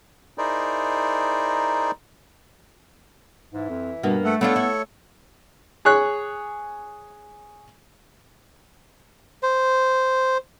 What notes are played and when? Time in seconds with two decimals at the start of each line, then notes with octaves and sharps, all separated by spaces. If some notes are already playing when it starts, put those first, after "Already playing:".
0.38 D#4 E4 G#4 A#4 C5 D5
3.53 G#2 E3
3.69 F2
4.03 G2 B2 A#3 B3
4.24 A3 A4 F#5
4.41 A3 B3 D4 F4 A4 C#5
4.56 E4
5.85 G#4 C#5 F#6
9.43 C5